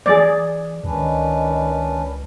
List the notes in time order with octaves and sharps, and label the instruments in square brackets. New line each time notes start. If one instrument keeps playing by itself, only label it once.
[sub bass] E3 [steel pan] G#4 D5
[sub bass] C#2 [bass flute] D#3 [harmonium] C#4 D4 B4